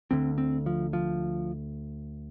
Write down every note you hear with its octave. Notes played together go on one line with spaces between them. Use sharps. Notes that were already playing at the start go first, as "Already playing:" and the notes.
D2 D3 C4
C4
F3
F3